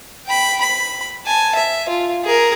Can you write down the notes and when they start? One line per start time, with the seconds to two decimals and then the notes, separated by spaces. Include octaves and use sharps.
0.26 G5 B5
0.60 B5
1.26 G#5 A5
1.55 E5
1.89 F4
2.25 G#4 A#4